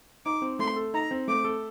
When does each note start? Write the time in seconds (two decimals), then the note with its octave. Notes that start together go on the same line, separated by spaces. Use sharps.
0.25 D#4 D6
0.42 C4
0.59 A3 C6
0.76 A4
0.93 D#4 A#5
1.11 C4
1.27 A3 D6
1.45 A4